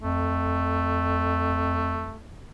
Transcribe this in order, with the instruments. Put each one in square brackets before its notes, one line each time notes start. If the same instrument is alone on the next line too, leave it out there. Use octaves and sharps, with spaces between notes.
[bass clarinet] F2 [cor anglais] A3